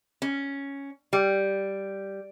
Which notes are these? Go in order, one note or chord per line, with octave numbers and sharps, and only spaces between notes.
C#4
G3